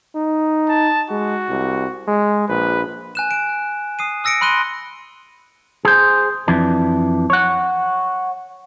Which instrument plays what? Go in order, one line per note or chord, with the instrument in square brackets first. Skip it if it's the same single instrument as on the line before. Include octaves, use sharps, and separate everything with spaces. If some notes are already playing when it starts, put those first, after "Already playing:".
[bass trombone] D#4
[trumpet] A5
[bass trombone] G#3 [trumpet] F#4
[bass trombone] C2
G#3
[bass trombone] A#1 [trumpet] B4
[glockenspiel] G#5 F#6 E7
D7 E7
D#6 C7 D#7
D#6 E6 A#6 C#7 D7
B5 C6 F#6 D#7 G7
[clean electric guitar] G#4 C5
F2 E3 D4
C#5 F#5